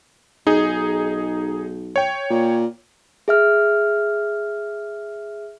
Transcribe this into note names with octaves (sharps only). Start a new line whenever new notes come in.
B1 D#4 G#4
C#5 G5
A#2
G#4 E5 F6